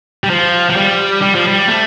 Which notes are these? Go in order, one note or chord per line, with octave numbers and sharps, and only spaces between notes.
G3
F3
F3
G3
G3
F3
G3
A3